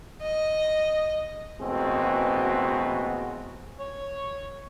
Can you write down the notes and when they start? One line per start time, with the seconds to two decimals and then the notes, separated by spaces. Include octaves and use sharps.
0.22 D#5
1.61 A1 B2 G#3 A#3 C4 F#4
3.79 C#5